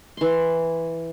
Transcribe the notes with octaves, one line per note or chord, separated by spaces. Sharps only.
E3 C6